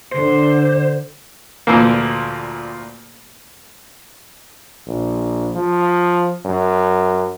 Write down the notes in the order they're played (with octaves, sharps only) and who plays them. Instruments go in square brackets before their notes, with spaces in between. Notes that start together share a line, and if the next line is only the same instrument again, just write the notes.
[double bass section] D3 [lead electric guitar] C5
[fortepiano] D2 A#2 E3 F3 A#3
[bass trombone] A#1
F3
F#2